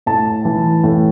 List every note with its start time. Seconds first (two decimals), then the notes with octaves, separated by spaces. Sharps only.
0.06 A2 A5
0.45 E3
0.84 A2